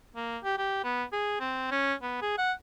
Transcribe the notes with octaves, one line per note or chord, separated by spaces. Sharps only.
A#3
G4
G4
B3
G#4
C4
C#4
B3
G#4
F#5